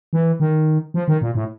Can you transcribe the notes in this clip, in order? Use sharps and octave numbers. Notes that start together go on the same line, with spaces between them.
E3
D#3
F3
D#3
A#2
A2